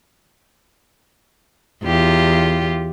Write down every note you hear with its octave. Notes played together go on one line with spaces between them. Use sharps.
E2 F4 G4